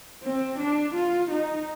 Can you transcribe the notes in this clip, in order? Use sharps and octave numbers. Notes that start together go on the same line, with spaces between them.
C4
D4
F4
D#4